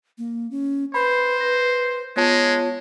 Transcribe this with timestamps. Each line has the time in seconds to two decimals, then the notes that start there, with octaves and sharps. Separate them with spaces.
0.18 A#3
0.51 C#4
0.94 B4 C5 B5
1.41 A#6
2.17 G#3 B3 F4 C#5 A5